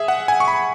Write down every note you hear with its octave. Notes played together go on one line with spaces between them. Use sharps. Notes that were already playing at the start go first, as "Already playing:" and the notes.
Already playing: G#4 E5
F#5
G#5
C#6
B5